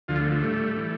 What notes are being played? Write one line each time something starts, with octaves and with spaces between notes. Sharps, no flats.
D2 D3 F3 F4
A3
A3
A2 G3
E3 G3